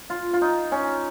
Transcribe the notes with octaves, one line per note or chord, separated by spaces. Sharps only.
F4
F4
D#4
C#4